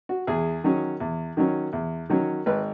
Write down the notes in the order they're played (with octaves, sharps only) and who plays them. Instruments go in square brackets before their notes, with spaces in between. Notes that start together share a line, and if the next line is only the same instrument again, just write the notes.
[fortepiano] F#4
E2 G#4
D#3 F#3 C#4
E2
D#3 F#3 C#4
E2
D#3 F#3 C#4
G#1 B4